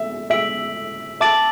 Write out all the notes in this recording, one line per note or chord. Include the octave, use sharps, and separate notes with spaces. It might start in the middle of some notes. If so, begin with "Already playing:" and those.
Already playing: E5
E5 E6 B6 D7 F#7
E5 A5 D6 A6 D7 F#7